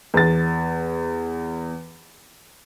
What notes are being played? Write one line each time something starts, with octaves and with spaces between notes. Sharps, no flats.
E2 A6